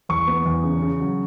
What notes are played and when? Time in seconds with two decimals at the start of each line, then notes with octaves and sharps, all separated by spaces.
0.09 E2 C#6
0.27 B3
0.46 E2
0.63 C#3
0.82 C#3
1.00 F#3